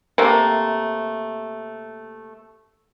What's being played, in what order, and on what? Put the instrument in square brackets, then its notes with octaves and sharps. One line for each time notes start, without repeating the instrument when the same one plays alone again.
[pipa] C3 A3 A#3